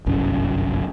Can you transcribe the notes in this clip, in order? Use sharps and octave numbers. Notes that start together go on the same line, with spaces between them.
G1 C2 F#2 C#4